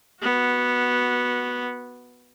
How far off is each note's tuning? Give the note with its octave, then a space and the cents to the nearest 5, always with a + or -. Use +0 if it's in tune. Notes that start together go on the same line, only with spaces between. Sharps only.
B3 -10 F#4 +0